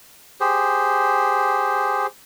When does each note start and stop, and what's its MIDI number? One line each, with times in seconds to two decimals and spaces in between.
0.40 2.07 67
0.40 2.07 68
0.40 2.07 72